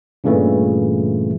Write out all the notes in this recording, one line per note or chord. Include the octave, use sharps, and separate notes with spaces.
G2 A#2 C#3 E3 A3